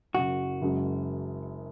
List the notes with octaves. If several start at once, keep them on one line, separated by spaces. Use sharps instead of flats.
F#1 F#2 C#3 F#4
F#1 F#2 C#3 G#3